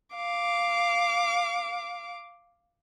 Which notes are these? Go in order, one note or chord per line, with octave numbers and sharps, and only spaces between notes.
F5 D6